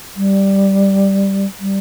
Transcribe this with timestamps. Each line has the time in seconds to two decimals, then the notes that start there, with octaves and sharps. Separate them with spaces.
0.15 G3
1.59 G3